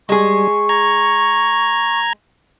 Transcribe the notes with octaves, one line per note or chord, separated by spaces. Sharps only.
G3 G#3 G#4 C#6
A#5 G#6